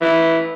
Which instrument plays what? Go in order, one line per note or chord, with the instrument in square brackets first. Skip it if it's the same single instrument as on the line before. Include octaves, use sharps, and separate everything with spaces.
[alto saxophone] E3